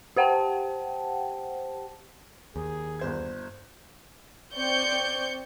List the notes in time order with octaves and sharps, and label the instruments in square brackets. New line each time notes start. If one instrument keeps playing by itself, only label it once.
[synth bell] G4 C5 F#5 G5 A5
[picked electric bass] D#2 [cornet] G#4
[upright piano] G1 C5 G#6
[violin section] C4 D5 C#6 G6 C#7